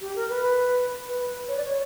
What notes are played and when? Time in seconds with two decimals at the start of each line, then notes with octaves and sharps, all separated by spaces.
0.01 G4
0.16 A#4
0.29 B4
1.09 B4
1.48 C#5
1.56 D5
1.64 C#5